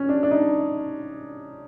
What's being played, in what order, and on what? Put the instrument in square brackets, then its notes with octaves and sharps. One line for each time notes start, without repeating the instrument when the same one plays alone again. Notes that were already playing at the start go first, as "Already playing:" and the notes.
Already playing: [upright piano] C#4
D4
D4
D#4